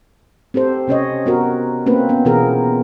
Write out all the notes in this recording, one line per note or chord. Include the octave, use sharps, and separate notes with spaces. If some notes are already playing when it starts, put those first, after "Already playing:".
C4 G4 A4 C5
C3 C#4 C#5 D#5
B3 F#4 A#4
A#3 C4 C#4 B4
B3 C#4
B2 E3 F4 G#4 A#4